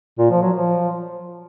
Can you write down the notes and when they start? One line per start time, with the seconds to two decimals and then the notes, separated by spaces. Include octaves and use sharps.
0.19 A#2
0.30 F3
0.42 F#3
0.53 F3